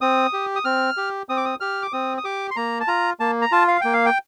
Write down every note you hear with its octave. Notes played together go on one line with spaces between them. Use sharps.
C4 D#6
G4
D#6
C4 F6
G4
C4 D#6
D6
D#6
G4 F6
D6
C4 D#6
D#6
G4 D6
C6
A#3 A#5
A5
F4 A#5
A#3 A5
A#5
F4 A5
F5
A#3 G5
F5
G5